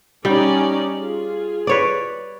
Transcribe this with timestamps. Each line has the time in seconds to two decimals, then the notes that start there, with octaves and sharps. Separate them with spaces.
0.25 G3 C#4 D#4 D5 G5
0.99 F4 G#4
1.67 B4 C#5 D5